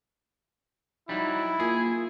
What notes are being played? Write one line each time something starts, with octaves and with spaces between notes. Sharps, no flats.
F#3 G3 D#4 E4
A#3 F4 G#4